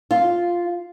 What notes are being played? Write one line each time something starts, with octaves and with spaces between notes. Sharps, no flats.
F4